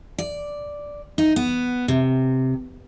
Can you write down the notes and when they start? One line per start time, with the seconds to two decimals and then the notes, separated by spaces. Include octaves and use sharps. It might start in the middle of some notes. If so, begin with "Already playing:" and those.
0.18 D5
1.18 D#4
1.36 B3
1.88 C3